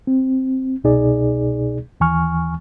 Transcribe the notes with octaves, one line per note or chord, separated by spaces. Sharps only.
C4
C2 B2 D#4 G#4 D5
D#2 E3 G#5 C#6 F6